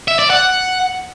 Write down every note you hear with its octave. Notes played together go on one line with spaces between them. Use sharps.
E5
D5
F#5